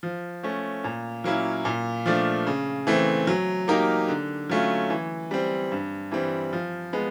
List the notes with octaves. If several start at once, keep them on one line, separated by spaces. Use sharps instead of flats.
F3
A3 C#4
A#2
F#3 A#3 C#4 E4
A#2
F3 A3 D4
C#3
E3 A3 C4
F#3
A#3 D#4 G4 A#4
D3
F#3 A3 C#4 F4
E3
G3 C4
G2
E3 G3 C4
F3
G#3 B3